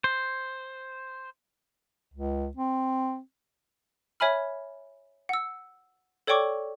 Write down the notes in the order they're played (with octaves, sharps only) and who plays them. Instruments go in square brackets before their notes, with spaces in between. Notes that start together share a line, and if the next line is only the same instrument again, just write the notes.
[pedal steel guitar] C5
[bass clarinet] C#2
C4
[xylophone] C#5 E5 G#5 B5 F6
F#5 E6
A4 C#5 D5 G5 C#6 D6